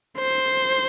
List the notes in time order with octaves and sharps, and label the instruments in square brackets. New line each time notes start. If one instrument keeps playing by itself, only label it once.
[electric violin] C5